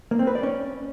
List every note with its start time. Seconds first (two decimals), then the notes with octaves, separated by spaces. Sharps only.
0.11 A#3
0.19 C4
0.27 B4
0.35 D5
0.43 C#4